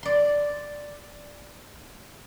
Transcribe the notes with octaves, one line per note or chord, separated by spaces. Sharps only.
D5 C6